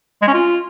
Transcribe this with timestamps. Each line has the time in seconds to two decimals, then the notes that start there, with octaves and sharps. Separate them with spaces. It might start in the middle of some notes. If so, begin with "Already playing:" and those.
0.22 G#3
0.28 C#4
0.34 F4